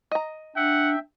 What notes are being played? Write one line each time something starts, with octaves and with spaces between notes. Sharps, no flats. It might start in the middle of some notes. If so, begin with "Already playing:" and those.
D#5 A#5
D4 E5 F#5 G5